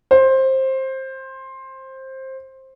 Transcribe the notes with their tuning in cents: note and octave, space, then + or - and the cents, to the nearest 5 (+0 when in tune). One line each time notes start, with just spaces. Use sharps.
C5 +15